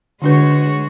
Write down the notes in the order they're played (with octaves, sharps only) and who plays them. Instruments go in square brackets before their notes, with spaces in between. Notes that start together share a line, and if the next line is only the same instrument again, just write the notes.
[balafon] D3 D4 B4 [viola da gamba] G#3 F#4 C#5